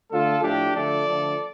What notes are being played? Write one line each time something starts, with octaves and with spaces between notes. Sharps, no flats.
D3 A3 F4 A4
A2 F3 A3 D4 G4
D3 F3 A3 A4 D5
D3 F3 A3